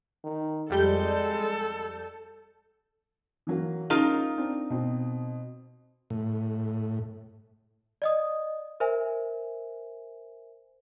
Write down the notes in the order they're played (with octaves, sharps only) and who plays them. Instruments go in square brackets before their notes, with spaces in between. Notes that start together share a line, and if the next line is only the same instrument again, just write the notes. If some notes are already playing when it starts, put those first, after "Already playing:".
[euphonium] D#3
[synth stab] F2 G3 G6 [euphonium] G#3 [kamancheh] A4
[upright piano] E3 F#3 A#3
[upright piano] C#4 G#4 [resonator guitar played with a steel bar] D#4 F4 A#4
[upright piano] C4 D4
B2 C4
[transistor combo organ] A2
[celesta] D5 D#5 D#6
A#4 C5 E5 G#5